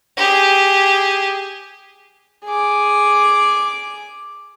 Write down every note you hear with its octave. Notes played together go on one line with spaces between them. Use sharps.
G4 G#4
G#4 D6